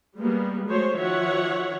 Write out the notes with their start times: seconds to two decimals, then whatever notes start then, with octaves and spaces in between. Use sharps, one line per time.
0.18 G3 G#3 A#3 B3
0.67 F#3 G#3 A3 C5 C#5
0.98 D#3 F3 F#4 C#5 E5 F#5